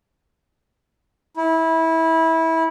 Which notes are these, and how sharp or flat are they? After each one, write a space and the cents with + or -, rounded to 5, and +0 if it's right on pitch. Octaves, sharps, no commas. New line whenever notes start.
E4 -20